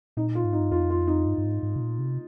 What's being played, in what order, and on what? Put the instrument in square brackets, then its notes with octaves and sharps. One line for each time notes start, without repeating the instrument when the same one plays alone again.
[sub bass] A#2 [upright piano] D#4
[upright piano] F4
[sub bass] G#2
[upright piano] D#4
[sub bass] G2
[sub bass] F2 [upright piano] F4
[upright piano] F4
D#4
[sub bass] G2
G2
G#2
G#2
C3
A#2
C3